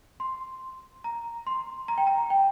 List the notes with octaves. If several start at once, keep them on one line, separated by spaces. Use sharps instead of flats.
C6
A#5
C6
A#5
G5
A#5
G5